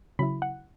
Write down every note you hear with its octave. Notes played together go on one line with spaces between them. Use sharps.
C#3 F#3 E4 B5
F#5